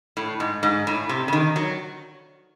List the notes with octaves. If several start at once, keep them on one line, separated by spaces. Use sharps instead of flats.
A2
G#2
G#2
A2
C3
C#3
D#3
F#3